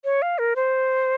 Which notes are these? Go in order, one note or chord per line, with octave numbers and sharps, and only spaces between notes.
C#5
F5
A#4
C5